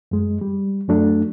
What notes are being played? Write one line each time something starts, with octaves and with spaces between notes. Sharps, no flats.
F#2 G#3
G3
F#2 F#3 A3 D4